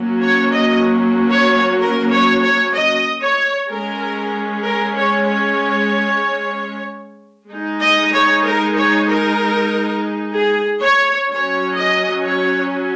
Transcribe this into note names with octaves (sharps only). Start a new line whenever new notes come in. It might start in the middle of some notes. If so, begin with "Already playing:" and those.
Already playing: F#3 A#3 C#4
C#5
D#5
C#5
A#4
C#5
C#5
D#5
C#5
G#3 C#4 A#4
A#4
C#5
C#5
G#3 D#4
D#5
C#5
A#4
C#5
A#4
G#4
C#5
F#3 C#4 C#5
D#5
C#5